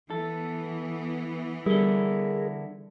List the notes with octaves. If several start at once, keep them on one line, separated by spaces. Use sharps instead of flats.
E3 B3 A4
D3 G3 E4 G#4 A#4